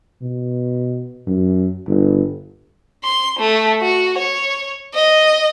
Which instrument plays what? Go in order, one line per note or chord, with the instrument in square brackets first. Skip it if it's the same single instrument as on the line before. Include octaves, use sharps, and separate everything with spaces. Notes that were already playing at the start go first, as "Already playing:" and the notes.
[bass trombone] B2
F#2
G1
[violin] C6
A3
F#4
C#5
D#5